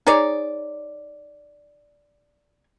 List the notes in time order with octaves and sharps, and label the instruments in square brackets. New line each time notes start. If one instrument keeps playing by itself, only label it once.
[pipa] D#4 G#4 C#5 D5